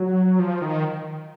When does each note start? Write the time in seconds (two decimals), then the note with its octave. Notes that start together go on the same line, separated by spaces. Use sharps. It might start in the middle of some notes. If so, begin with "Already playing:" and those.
Already playing: F#3
0.39 F3
0.62 D#3